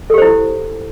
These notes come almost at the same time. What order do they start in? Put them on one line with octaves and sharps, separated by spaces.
A4 G4 C5 E4